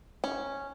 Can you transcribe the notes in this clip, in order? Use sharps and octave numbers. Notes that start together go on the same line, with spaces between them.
C#4